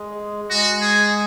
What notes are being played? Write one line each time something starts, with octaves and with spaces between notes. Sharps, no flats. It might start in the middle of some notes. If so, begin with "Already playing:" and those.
Already playing: G#3
G#3 F#4
G#4